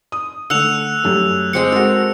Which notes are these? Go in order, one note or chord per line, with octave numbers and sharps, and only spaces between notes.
D#6
D3 A3 F#5 E6 F#6 F7
F#2 G3 A3
G#3 C4 D6 C#7
G#3 F#4 A4 A#4